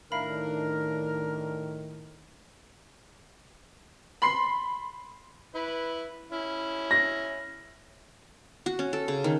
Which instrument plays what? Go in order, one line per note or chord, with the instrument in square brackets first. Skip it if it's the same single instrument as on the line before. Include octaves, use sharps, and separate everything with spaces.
[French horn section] A2 D#3 [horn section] D4 A#4 [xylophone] E5 F5 B5
[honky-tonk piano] B5 C6 C7
[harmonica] E4 B4
C#4 E4
[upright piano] A#6
[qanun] F#4
C#4
A4
C#3
D#3